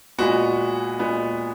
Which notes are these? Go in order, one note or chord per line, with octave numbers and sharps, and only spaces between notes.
A#2 G#3 B3 F#4
A#2 G#3 B3